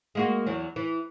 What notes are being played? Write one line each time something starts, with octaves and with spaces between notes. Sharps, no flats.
G#3 A#3 F#4
E2 E3 F#3
E3